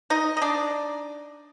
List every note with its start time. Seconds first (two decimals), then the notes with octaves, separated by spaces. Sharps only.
0.10 D#4 D#5
0.37 D#5
0.42 D4 D5